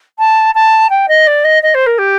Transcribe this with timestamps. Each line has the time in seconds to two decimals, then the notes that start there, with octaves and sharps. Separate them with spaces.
0.18 A5
0.54 A5
0.90 G5
1.08 D#5
1.27 D5
1.44 D#5
1.62 D#5
1.74 C5
1.86 A#4
1.98 G4